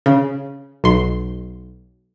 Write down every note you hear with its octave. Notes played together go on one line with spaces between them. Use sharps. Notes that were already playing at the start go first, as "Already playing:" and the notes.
C#3
B1 C6